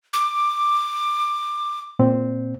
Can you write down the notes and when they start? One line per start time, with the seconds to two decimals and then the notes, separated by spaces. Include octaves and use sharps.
0.13 D6
1.99 A#2 C4